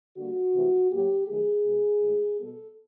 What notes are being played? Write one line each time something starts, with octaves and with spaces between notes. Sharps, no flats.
D3 G3 A#3 F#4
C3 E3 A3
A2 F#3 A#3 G4
D#3 F#3 A3 G#4
B2 G#3 B3
A2 E3 G#3
B2 G3 B3 A4